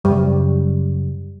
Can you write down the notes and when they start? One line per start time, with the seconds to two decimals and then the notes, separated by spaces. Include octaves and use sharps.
0.05 F#2 C#3 G3